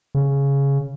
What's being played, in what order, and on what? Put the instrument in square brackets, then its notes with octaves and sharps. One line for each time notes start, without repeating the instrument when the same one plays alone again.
[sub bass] C#3